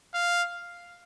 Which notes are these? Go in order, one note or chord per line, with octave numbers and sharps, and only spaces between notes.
F5